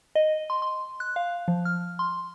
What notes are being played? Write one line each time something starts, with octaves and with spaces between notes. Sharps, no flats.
D#5
C6
C6
F#6
F5
F3
F6
C6